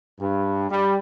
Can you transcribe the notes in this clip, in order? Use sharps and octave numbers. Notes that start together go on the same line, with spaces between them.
G2
G3